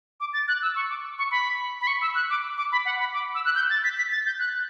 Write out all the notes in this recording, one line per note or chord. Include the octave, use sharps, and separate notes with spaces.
D6
A6
F#6
E6
C#6
D6
C#6
B5
B5
C#6
E6
F#6
D6
D6
B5
F#5
B5
D6
E6
F#6
G6
A6
B6
B6
A6
G6
F#6